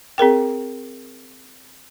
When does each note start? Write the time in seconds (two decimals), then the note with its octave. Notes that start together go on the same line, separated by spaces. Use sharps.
0.18 C4 G#4 A#4 G5